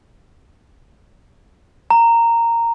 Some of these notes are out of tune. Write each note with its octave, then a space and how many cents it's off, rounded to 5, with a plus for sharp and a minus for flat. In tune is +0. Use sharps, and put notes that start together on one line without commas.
A#5 -10